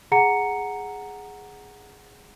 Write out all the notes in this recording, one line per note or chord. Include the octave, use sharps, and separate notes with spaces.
G#4 F#5 A#5 C#7